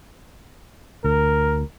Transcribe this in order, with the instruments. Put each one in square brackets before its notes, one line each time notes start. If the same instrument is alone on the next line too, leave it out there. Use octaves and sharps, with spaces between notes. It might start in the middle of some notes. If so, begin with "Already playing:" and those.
[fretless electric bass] D2 [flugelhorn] A#4